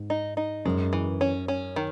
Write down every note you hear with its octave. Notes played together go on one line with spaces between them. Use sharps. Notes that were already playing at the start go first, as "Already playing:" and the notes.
Already playing: G#2
D#4
D#4
F#2 G#3
E3
C#4
C#4
D#3